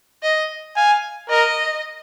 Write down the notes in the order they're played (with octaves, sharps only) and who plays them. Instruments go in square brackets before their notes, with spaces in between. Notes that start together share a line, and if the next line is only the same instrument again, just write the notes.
[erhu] D#5
[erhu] F5 [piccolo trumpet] G#5
[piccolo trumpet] A#4 [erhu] D#5